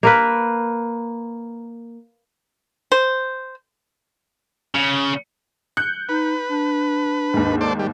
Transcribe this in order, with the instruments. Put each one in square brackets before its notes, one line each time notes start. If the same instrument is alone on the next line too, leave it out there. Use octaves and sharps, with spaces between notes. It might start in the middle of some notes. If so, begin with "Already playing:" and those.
[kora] A#3 A#4 B4
[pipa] C5
[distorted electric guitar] C#3
[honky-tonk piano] F#6 G6 C#7
[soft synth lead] D#4 [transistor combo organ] B4
[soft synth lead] D4
[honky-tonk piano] D#2 G#2
[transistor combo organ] A4 C5 D5
G3